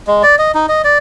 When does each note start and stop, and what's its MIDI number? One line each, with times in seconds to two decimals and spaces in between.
0.07 0.22 56
0.23 0.35 74
0.39 0.52 75
0.55 0.66 63
0.69 0.82 75
0.84 0.98 74